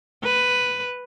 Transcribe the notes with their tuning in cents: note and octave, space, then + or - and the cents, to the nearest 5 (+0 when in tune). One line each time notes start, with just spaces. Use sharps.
B4 +5